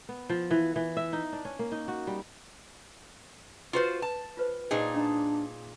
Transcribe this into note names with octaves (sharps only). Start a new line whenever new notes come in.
B3
F3
E3
E3
E5
D#4
D4
C#4
A#3
D#4
F#4
G3
F4 F#4 B4 C5 D#6
A5
F4 B4 C5
A#2 D#4 G#4 C5 G5 A5
C#4 D4 D#5 A#5